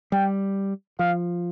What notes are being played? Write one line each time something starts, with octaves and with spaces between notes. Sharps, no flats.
G3 G5
F3 F5